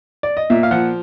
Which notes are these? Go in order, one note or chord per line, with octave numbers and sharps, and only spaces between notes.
D5
D#5
A#2 E5
F5
F3 F#5